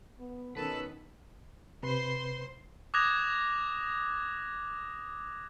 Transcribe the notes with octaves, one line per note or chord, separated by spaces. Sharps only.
B3
B2 D#3 C#4 A4 B4 A5
C3 B4 C5 B5 C6
D6 D#6 F#6 G#6 A#6 F7